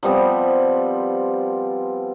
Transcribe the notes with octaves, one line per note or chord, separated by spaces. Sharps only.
F3 G3 B3 C4